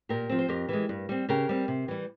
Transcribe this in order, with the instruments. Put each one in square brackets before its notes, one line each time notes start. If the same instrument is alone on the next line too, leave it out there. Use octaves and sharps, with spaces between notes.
[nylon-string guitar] A#2 G4 A#4
F3 C4
C5
F2 G4 A#4
E3 G#3
G2
G3 C4
C#3 G4 A#4
G3 C4
C3
E3 G3